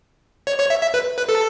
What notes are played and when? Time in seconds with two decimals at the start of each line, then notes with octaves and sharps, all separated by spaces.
0.47 C#5
0.60 C#5
0.70 E5
0.82 E5
0.94 B4
1.18 B4
1.29 A4